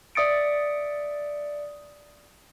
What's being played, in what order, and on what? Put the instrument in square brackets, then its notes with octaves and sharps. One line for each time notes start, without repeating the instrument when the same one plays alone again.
[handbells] D5 E5 D#6 A6 C#7 D7